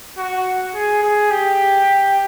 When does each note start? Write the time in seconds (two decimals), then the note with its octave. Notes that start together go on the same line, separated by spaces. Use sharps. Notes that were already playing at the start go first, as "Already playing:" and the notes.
0.17 F#4
0.74 G#4
1.02 G#4
1.30 G4